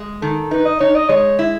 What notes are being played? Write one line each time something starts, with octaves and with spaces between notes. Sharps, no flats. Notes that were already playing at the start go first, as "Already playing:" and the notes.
Already playing: G#3
D#3 A4
D#4 B4
D#5
D#4 C#5
D#5
G#3 C#5
E4